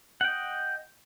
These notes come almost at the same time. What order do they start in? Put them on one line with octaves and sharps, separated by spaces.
F#5 G5 D#5